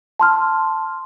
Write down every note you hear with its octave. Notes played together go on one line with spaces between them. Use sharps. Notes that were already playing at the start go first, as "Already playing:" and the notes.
A5 C6 F6